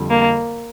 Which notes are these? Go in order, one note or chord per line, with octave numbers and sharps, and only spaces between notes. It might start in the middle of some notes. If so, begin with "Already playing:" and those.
Already playing: F2 D3 G3
A#3